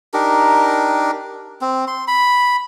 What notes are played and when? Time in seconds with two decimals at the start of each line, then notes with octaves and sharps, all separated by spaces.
0.14 D4 D#4 G4 A#4
1.61 C4
1.88 C6
2.08 B5